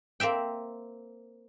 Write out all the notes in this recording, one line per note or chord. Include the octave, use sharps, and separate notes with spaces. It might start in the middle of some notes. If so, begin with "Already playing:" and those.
A#3 C4 E5 G5